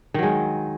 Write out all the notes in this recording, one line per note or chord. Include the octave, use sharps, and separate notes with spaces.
D#3 F#3 G#3